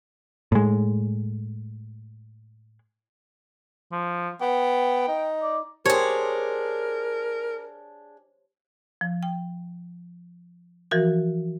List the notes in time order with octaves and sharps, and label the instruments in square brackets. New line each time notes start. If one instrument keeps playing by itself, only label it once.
[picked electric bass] A2 G#3
[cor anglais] F3
[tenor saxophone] B3 [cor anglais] G5
[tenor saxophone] D#4
[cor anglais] D5
[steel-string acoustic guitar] D4 G#4 [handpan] G4 C5 [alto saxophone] A#4 [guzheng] C#5
[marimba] F3
G5
E3 F3 F#4 A#4